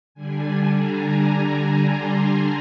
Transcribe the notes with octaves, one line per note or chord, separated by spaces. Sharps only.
D3 G3 D4 G#5
A#5
G#5
A#5
C6